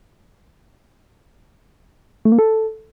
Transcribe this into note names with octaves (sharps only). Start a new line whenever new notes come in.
A3
A#3
A4